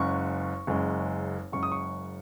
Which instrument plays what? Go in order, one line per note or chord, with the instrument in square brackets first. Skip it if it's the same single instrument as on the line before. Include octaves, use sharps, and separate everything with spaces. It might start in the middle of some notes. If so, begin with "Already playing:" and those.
Already playing: [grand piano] F#1 F#2 C#3 G#3 C#6
F#1 F#2 C#3 G#3
F#1 F#2 C#3 G#3 C#6
D#6
C#6